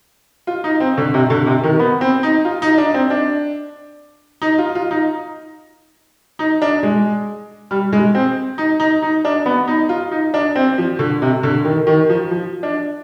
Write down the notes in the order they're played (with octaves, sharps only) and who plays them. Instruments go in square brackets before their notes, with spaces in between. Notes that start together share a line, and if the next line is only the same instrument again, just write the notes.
[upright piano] F4
D#4
C4
D3
C3
D3
C3
D#3
B3
C4
D#4
F4
D#4
D4
C4
D4
D#4
F4
F4
D#4
D#4
D4
G#3
G3
G#3
C4
D#4
D#4
D#4
D4
B3
D#4
F4
D#4
D4
C4
F3
D3
C3
D3
D#3
D#3
F3
F3
D4